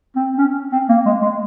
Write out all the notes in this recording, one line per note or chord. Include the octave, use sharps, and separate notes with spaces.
C4
C#4
C4
A#3
G#3
G#3